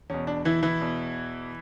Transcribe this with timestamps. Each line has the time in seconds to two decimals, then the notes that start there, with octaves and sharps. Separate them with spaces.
0.10 E2 B2 C#4
0.27 D4
0.45 E3 E4
0.63 E3 E4
0.81 E2 B2